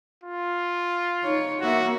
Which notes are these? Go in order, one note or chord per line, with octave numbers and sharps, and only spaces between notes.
F4
D#4 C#5
A#3 F#4 E5